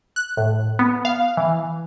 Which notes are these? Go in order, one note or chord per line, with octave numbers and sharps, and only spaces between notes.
F#6
A2
B3
F5
E3